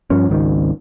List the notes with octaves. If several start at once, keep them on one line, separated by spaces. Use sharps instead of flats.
G2 F3 C#4
G#1 C#2 D3 D#3